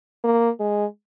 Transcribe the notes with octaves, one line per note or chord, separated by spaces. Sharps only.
A#3
G#3